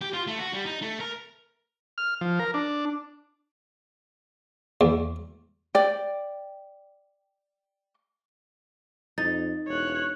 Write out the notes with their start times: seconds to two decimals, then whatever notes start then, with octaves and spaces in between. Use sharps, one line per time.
0.01 G4
0.13 F4
0.27 A3
0.39 F#4
0.53 G3
0.65 D#4
0.82 A3
1.00 A#4
1.98 F6
2.21 F3
2.39 A#4
2.54 D4
4.81 E2
5.75 D5 G5
9.18 F2 D#4 A6
9.68 E1 C#5 F#6